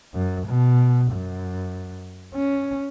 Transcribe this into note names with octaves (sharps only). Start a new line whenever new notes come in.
F#2
B2
F#2
C#4